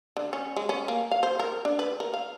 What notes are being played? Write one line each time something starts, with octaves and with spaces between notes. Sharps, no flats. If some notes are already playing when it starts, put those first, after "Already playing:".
D3
C#4
G#3
C#4
A#3
F5
C5
A#4
D4
B4
A#4
F5